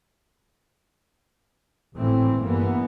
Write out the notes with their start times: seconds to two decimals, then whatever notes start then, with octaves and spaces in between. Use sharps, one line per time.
1.94 G#1 A2 E3 C4
2.41 G2 E3 A#3 B3